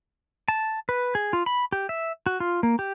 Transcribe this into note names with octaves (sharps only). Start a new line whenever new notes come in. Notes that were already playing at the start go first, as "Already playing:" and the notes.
A5
B4
G#4
F4
B5
G4
E5
F#4
F4
A#3
G4